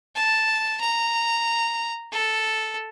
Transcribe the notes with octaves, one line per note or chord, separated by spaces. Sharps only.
A5
A#5
A4